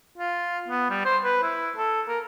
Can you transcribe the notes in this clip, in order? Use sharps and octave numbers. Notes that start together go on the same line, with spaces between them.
F4
B3
G3
C5
B4
E4
A4
A#4